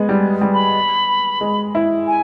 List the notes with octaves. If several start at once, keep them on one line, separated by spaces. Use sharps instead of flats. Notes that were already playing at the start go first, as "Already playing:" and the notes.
Already playing: G#3 B3
G3
G3
B5
G#3
E4
G#5